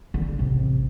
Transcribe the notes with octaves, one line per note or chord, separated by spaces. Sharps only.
D3 A3
A1 C3